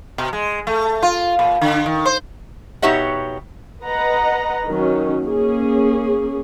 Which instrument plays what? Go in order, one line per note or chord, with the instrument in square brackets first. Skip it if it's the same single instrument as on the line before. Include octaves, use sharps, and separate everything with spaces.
[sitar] B2
G#3
A3
F4
A#2
D3
D#3
C5
[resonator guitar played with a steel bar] B2 D#4 G4 C#5 E5 F#5
[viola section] B4 D#5 F#5 A#5
D#3 F#3 C#4
A#3 C#4 G#4